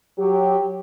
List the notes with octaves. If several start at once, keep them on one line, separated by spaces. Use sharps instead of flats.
F#3 G4